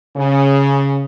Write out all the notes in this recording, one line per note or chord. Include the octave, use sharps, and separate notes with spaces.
C#3